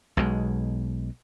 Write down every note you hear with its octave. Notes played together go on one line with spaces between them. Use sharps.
B1 B2 G#3